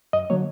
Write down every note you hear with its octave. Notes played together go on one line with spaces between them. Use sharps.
F#2 D#5
D3 F#3 A#3 C#5